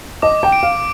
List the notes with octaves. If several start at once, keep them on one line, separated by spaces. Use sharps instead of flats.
D#5 D6
G5
D7
F5